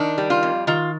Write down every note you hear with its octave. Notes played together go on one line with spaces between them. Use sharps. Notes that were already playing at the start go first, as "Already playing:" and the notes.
Already playing: D#3 D4
G3
F4
F2
D#3 F4